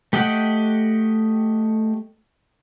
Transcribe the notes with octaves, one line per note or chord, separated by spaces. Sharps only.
A3 G4 D#5 F#5 G5